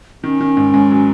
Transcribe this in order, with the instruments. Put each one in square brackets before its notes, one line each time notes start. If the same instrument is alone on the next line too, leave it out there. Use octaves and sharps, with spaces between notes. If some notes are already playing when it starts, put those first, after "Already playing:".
[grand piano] D#3 [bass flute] C#4
[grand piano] D#3
G#2
G#2
F#3